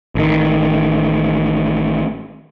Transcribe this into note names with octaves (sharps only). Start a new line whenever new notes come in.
A1 D#3